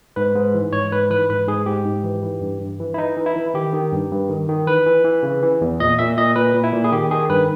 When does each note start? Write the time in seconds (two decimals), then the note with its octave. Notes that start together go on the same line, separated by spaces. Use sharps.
0.16 G#2 B4
0.35 G#2
0.54 E3
0.73 G#2 C#5
0.92 G#2 B4
1.10 E3 B4
1.30 G#2 B4
1.48 G#2 G#4
1.66 G#2 G4
1.85 G#2
2.04 E3
2.22 E3
2.41 G2
2.61 G2
2.80 E3
2.94 E4
2.98 E3 D#4
3.17 E3
3.26 E4
3.36 E3
3.54 D#3 G4
3.74 D#3
3.93 G2
4.11 G2
4.30 D#3
4.48 D#3
4.67 E3 B4
4.86 E3
5.05 E3
5.23 C#3
5.43 E3
5.61 E2
5.80 A#2 D#5
5.99 A#2 E5
6.17 A#2 D#5
6.36 A#2 B4
6.55 A#2
6.64 E4
6.73 A#2
6.84 G#4
6.92 D#3 G4
7.11 D#3 G#4
7.29 G2 B4